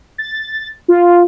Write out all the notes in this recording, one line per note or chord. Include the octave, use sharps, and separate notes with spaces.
A6
F4